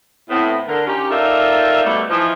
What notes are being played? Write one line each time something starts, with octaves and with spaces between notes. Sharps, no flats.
A2 B3 C4
D3 A#4
C#4 D#4 F4 G4
D#4 F4 A4 A#4 D5 E5
B2 G3 A3
E3 F3 D#4